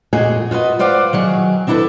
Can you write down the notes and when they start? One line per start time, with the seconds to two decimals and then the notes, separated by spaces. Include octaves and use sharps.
0.13 F2 A#2 F#4 G#4 D#5 G#5
0.51 F4 F#4 B4 D#5
0.79 B4 C5 D5 F5 F#5
1.13 D#3 F#3 G#4
1.67 C4 D4 E4 F4 A4 B4